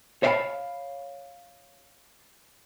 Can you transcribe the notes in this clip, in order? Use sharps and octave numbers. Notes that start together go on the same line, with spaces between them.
C#5 E5 F5 G5 A5 B5